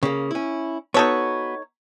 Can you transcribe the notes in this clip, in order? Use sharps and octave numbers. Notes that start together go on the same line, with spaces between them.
C#3 A#3
C#4 E4
B3 D#4 F#4 A4 C#5